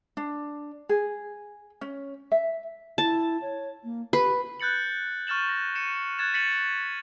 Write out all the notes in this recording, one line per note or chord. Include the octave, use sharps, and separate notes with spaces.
D4
G#4
C#4
E5
E4 A5
C#5
A#3
G4 B4
F#6 G6 A6 C#7 F#7
C#6 F6 A6 E7 F#7
A#6
C#7 D#7 E7
F#6 G#6 A6 E7
A6 B6 C#7 D#7 E7 F#7